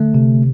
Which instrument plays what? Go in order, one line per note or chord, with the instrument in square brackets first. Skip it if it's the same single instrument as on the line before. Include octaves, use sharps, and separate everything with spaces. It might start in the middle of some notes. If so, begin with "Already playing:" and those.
Already playing: [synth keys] D3 [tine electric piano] A3
[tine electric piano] C3